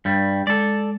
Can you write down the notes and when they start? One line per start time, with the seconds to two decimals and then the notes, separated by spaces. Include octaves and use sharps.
0.05 G2 G3
0.47 G#3 A4 D5